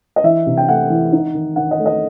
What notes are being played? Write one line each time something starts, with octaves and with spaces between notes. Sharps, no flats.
D#5
E3 E5
C3
G5
A3 F#5
E3
D#4
D#3
D#3 F#5
D#5
A3
D#5